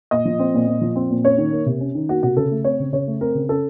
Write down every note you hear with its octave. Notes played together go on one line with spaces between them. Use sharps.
A#2 D#5
F3
C4
A#2
A#2
F3
C4
A#2
C#4 C#5
D#3
A#3
C3
C#4
D#3
A#3 F#4
C3 F#4
C#3 A4
A3
C4 C#5
C#3
C#3 C#5
A3
C4 A#4
C#3
C#4 A4